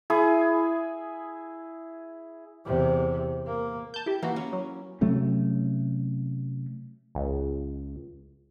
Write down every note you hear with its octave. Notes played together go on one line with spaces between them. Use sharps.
E4 G#4 D#6
E2 C3
A#3
A5 G6
E4 G4
E3 A#3 E4 F#4
C#4
F#3
C3 F#3 A3 C#4
C#2